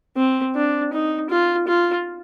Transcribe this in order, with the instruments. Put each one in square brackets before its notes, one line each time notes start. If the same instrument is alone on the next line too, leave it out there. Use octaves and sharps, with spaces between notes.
[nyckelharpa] C4
D4
D#4
F4
F4